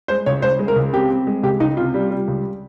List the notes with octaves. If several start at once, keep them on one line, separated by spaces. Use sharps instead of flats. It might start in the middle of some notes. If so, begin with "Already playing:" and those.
G#3 C5
C#2 C#5
C#2 C5
G#3
A#4
C#2
C4 G4
C4
G#3
C#2 G4
C#2 D#4
C3 F4
G3
G3
C#2